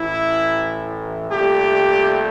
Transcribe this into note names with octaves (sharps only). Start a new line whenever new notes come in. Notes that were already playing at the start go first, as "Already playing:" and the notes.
Already playing: A1 A2 E3 E4
C2 A#2 A3 G4